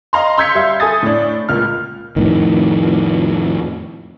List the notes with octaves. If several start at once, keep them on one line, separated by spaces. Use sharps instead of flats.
D#5 F5 A#5 C6
C6 E6 G6 G#6 B6 C#7
G3 E5 F5
A4 G#5 D#6 A6
A2 D4
C#2 A#2 F6
F2 A2 D#3